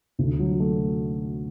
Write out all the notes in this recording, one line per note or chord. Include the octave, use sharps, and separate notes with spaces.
D2
F#3
A3